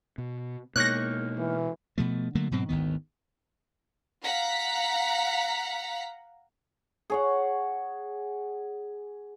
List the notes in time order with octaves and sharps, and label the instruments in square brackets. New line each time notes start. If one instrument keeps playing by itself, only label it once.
[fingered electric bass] B2
[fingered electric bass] B2 G#3 [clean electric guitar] A#3 D#4 C#5 [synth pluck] F#6 A#6
[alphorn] E3
[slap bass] B2 F3 A3
D3 F#3 A3 A#3
G#2 B2 F#3 C4
G#1 D2 D#3 B3
[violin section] F5 F#5 A#5 B6
[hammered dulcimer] G#4 C#5 F#5